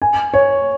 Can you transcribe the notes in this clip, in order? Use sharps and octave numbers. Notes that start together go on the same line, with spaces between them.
G#5
C#5